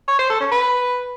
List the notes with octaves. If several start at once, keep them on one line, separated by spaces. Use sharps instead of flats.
C#5
C5
A4
C#4
B4